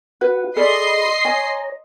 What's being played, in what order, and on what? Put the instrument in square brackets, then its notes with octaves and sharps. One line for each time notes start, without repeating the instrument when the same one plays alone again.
[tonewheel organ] F#4 F#5 [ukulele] B4
[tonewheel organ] G#4 B5 [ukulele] A4 D5 [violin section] D#5 C6 C7
[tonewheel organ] C#5 A#5 [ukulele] G#5